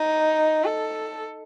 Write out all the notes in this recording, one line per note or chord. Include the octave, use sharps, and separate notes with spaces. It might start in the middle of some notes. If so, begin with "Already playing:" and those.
Already playing: D#4
A4